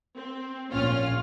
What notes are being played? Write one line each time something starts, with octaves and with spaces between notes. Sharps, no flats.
C4
A#1 C#4 F4 F6